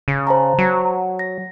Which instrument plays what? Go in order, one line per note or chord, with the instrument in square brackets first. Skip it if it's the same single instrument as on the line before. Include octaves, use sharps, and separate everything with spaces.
[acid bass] C#3
[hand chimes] C5 A5 A#5
[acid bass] F#3
[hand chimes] A#6